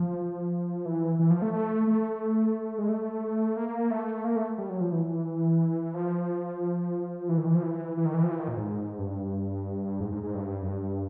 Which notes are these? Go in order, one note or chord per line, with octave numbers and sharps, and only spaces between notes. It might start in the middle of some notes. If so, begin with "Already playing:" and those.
Already playing: F3
E3
E3
F3
A3
A3
A3
G#3
A3
A#3
A3
A#3
A3
G3
F#3
F3
E3
F3
E3
D#3
E3
F3
E3
E3
D#3
E3
F3
E3
D#3
A#2
G#2
G2
G#2
G#2
G#2
G2
F#2
G2